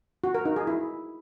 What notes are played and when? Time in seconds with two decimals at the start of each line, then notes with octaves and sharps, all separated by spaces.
0.24 F#4
0.34 A#4
0.45 D#4
0.56 G#4
0.67 E4